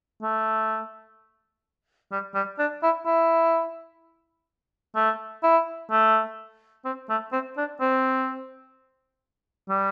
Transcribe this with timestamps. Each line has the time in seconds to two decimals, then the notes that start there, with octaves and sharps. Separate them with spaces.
0.22 A3
2.12 G3
2.35 G3
2.59 D4
2.83 E4
3.06 E4
4.96 A3
5.43 E4
5.91 A3
6.85 C4
7.09 A3
7.32 C4
7.57 D4
7.81 C4
9.69 G3